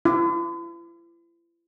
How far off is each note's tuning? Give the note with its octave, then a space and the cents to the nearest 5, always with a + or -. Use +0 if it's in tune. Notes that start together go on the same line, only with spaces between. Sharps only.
E4 +45